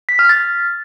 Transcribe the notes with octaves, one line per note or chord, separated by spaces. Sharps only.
B6
F6
A6